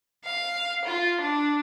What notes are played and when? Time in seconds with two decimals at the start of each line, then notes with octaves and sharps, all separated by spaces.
0.24 F5
0.85 F4
1.21 D4